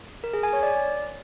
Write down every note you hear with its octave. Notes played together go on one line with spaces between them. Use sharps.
A#4
G#4
G#5
C#5
D5